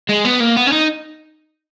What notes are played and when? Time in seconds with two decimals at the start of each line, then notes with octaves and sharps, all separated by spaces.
0.09 G#3
0.25 B3
0.40 A#3
0.56 B3
0.67 C#4
0.72 D#4